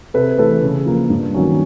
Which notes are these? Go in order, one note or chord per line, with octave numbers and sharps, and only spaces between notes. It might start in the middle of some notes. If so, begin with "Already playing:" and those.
C3 A4 B4
E3 A3 A4 B4
C#3
F3 A#3
G2
D#3 F#3 A#3 C#4